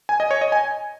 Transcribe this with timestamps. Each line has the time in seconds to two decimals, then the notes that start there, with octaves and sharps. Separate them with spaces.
0.09 G#5
0.20 D#5
0.31 C#5
0.41 D#5
0.52 G#5